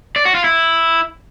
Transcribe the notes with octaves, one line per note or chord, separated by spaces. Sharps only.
D5
F#4
F4
E4